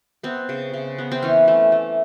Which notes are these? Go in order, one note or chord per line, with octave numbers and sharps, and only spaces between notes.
B3 C4
C#3
C#3
B3
C4
E3 C#4
A3
A3